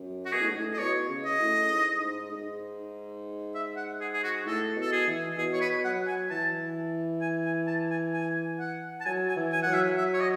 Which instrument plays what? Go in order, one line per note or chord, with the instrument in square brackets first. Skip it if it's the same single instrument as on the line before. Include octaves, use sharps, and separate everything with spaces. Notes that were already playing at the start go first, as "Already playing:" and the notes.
Already playing: [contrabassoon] F#2
[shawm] F#4
[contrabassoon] B2 [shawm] G#4
[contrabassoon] A2
G#2
A2
[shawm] D#5
[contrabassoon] B2 [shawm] C#5
[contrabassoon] C#3
[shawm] D#5
[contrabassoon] A2
G#2
G#2
G#2
[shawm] E5
F#5
G#4
G#4
F#4
[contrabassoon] A2 [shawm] A4
[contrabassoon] B2
[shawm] A4
G#4
[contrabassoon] E3
[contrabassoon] B2 [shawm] G#4
[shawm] C#5
B4
[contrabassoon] F#3 [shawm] F#5
[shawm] G#5
[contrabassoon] E3 [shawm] A5
[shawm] G#5
G#5
A5
G#5
G#5
F#5
A5
[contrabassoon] F#3 [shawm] G#5
[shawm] G#5
[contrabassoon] E3
[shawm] G#5
[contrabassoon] F#3 [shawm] F#5
[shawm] E5
E5
C#5
D#5